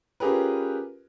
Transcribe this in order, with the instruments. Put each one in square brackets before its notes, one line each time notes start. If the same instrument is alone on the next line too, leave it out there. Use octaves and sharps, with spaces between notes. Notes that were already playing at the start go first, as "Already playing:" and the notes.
[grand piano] C#4 F4 G4 G#4 A#4 B4